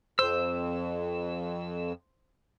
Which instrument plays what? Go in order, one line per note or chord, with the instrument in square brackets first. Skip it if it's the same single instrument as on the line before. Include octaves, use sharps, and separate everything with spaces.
[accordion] F2 [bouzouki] C5 [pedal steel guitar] E6